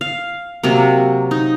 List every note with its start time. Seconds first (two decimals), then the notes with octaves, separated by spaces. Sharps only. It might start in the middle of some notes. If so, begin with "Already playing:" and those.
0.01 F5
0.64 C3 F#3 A#3
1.31 D#4